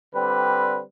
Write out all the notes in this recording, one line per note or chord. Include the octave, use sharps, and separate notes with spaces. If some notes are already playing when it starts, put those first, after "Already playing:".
D3 G3 C4 B4